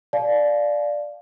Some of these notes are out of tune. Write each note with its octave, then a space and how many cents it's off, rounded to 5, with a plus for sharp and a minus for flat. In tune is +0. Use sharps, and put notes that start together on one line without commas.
D5 +0 F5 +0 A5 -40